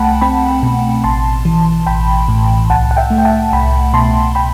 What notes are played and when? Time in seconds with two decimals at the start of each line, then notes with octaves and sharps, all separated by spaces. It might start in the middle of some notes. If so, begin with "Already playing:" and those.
Already playing: C2 A3 F#5 G5 A5 B5
0.21 C4 G5 B5
0.63 B2
1.04 A1 A5 C6
1.45 E3
1.87 A1 G5 B5
2.28 A2
2.70 C2 F#5 A5
2.91 F#5
2.97 E5 G5
3.10 A3
3.18 G5
3.25 F#5 A5
3.53 C2 G5 B5
3.94 B2 A5 C6
4.35 G5 B5